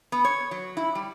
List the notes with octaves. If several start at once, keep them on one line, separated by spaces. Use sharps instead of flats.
B3
C#5
F#3
E4
G3